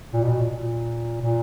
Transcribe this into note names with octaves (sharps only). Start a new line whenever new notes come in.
A#2
B2
A#2
A#2
A#2